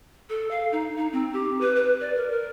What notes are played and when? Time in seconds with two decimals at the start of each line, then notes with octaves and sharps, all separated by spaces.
0.29 A4
0.51 F5
0.72 D#4
0.97 D#4
1.13 C4
1.33 G4
1.60 B4
1.75 B4
2.00 D5
2.15 A#4
2.31 A#4